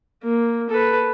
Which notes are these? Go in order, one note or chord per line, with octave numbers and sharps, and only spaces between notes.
A#3
A4 B4